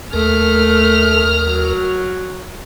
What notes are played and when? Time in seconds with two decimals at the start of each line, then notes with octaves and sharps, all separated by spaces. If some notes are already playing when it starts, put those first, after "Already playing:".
0.13 D#2 A3 A#4 F6
1.47 F#3